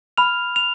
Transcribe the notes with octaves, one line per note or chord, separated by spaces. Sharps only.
B5 F6 F7
F7